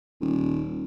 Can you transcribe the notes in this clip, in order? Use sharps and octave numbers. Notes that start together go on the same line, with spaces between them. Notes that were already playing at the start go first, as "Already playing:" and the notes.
D#1